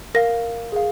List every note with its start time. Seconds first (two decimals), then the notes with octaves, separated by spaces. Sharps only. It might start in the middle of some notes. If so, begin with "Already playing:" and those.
0.15 A#4 F5 A#6
0.72 G#4 F5